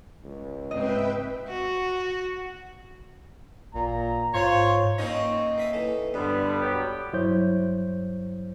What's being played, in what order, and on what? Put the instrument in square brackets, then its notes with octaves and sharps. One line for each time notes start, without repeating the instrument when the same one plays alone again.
[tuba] C#2
[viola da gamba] G#2 C3 C4 [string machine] B4 E5 G5 [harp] D#5
[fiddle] F#4
[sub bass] A1 [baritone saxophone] A#2 [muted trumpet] A#5
[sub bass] G#2 [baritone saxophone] F4 [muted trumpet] C5 [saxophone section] C#5
[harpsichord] A#3 A#5 [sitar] C4 C#4 D#4
[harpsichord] A#3 E5 D#6
E3 A4
[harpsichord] G2 [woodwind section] D3 G3 [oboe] B3
[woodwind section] F#3 G4
[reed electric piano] G2 F#3 E4 C5 C#5 G6